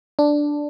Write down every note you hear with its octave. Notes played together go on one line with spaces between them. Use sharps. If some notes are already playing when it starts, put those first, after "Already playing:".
D4